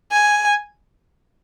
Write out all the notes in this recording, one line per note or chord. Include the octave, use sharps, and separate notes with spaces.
G#5